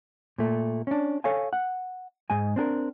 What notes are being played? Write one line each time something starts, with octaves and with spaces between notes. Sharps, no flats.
A#2 A3
C#4 D4
A4 C#5 F5 G#5
F#5
G#2 G#3 G#5
C4 D4 G#4 A#4